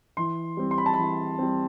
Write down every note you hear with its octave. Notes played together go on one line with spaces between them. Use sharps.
E3 C6
G3 C4
C6
B5
A5
E3 B5
G3 C4